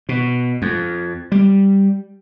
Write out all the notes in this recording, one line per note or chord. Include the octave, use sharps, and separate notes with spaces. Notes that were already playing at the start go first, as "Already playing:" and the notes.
B2
F2
G3